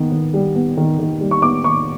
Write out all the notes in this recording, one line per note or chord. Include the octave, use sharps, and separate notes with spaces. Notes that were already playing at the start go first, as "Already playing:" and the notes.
Already playing: D#3 B3
D#3
G3
B3
D#3
D#3
G3
C#6
B3 D6
D#3 C#6